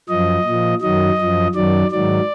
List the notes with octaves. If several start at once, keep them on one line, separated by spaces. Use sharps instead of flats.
F#2 F3 D#5
A#2 F3
F#2 D#3 F#3 D#5
F#2 F3
F#2 D#3 F#3 D5
G#2 D#3 F#3 D5